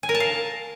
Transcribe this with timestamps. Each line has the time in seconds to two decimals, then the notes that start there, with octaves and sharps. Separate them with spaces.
0.03 G#5
0.09 A#4
0.15 A5
0.20 F5